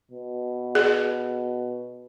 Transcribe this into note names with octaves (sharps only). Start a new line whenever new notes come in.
B2
G#4